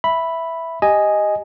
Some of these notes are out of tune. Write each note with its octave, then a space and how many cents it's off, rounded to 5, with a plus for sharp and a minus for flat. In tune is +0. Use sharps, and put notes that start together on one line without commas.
E5 +0 B5 +0
G4 +0 D#5 +0 G#5 +0